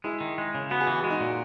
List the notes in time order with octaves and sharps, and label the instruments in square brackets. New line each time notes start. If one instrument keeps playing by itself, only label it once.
[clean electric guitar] G#3 [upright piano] E4 G#4
[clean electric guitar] D#3
G#3
C#3
[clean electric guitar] B3 [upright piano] F#4
[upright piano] G#4
[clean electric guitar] E3 [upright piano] F#4
[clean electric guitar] G#3 [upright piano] G#4
[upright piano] D#4 F#4
[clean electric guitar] A#2